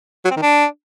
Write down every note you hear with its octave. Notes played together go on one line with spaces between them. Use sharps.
F#3
C4
D#3
D4